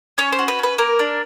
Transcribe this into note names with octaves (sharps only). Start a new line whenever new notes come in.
C#4 C#5
C5
F#4
B4
C#4 B4
A#3 A#4
D4